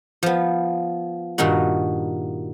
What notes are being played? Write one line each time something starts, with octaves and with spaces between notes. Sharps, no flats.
F3 B3
G2 A#2 D#3 D#4 F#4